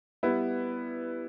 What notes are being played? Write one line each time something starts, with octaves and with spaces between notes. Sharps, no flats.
G3 B3 E4 B4